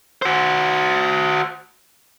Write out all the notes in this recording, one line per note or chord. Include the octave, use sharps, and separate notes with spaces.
F#4 C5